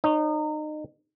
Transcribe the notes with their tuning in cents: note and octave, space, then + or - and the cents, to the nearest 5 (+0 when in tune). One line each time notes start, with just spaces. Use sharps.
D#4 -30 C#5 +0